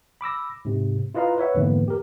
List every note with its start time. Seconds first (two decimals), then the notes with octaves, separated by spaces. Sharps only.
0.21 B5 D6 E6 A#6
0.65 G#2 C3
1.15 E4 F4 B4 D#5 F5 A#5
1.38 B4 C#5 E5 F#5
1.55 F2 G#2 D3 E3 A#3 B3
1.88 G4 A#4